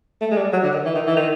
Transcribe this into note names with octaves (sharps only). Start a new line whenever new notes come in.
A3
G#3
G3
F#3
D3
D#3
E3
D#3
E3
D#3